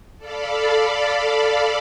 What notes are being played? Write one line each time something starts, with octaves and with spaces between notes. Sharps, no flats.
A4 D5 F5 B5